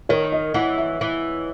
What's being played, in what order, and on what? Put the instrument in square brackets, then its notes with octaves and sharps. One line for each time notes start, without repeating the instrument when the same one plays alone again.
[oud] D#3 [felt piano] C#5
[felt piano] D#5
[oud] E3 [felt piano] F#5
[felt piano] E5
[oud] E3